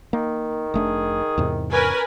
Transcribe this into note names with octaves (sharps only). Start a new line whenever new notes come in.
D#3 A#3
F1 A3 D4 G#4
E2 G#2 C3
C#4 A#4 B4 G#5